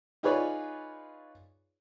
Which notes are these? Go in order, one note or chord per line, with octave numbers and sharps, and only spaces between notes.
D#4 F4 G#4 B4 C#5 D5